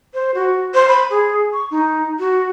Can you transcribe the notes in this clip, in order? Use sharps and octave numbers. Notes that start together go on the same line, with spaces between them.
C5
F#4
C5
B5
G#4
C#6
D#4
F#4